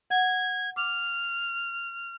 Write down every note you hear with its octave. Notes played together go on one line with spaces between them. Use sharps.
F#5 G#6
D6 F6